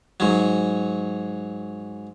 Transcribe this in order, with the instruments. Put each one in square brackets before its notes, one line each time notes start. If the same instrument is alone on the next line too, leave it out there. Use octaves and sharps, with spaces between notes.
[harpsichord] G#2 F#3